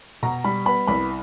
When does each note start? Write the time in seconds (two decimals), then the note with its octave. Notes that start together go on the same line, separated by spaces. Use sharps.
0.23 B2 A#5
0.44 G3 B5
0.66 B3 B5
0.87 C2 B5